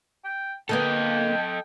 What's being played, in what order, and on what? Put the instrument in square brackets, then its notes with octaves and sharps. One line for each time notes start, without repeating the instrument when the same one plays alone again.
[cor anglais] G5
[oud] D3 A#3 B3 [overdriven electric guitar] A4 D#5 [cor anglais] G5